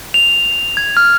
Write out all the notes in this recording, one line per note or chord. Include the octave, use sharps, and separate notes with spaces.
F7
G#6
F6